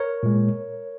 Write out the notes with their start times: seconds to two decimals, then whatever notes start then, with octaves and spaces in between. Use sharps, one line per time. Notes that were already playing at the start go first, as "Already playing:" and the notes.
Already playing: A#4 C#5
0.23 A#2 G#3